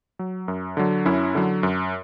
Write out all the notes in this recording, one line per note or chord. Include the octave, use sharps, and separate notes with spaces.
F#3
F#2
D3 F#3
F#2 C#4 E4
D3 F#3
F#2